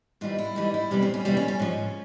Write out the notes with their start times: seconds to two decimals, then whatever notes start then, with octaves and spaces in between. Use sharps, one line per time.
0.21 G#2 E3 G3 F4
0.38 E4
0.55 G#2 E3 G3 D#4
0.74 E4
0.91 E2 C3 E3 G3 D4
1.02 C4
1.14 C#4
1.25 E2 C3 E3 G3 C4
1.37 C#4
1.48 C#4
1.59 G#2 F3